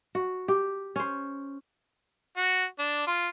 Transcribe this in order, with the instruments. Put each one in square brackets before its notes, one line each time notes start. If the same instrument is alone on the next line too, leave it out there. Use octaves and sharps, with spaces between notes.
[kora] F#4
G4
C#4 C5
[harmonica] F#4
D4
F4